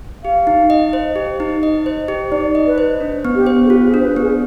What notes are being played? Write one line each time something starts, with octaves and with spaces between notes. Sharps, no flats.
G4 F5
D#4
D#5
C5
G4
D#4
D#5
C5
G4
D#4 D5
D#5
B4
C5
D4
B3
G4
C5
G#4
F4 G4
G#4
D4
C5
B4
B3
G#4